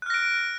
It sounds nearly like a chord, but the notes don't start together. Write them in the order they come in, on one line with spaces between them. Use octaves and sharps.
F#6 F6 A#6 D7